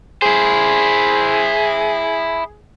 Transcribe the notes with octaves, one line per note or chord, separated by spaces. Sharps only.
E4 G#4 C5